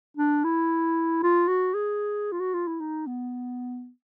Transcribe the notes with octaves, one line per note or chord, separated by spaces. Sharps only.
D4
E4
F4
F#4
G#4
F4
F#4
F4
E4
D#4
B3